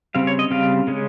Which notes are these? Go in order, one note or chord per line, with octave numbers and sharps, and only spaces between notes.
C#3 G3 C4 F5
C#5
D#5
C#3 G3 C4 F5
C#3 G#3 C#4